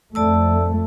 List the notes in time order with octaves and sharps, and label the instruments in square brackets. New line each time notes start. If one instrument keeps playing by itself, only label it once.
[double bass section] F2 A3 [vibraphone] D5 A5 E6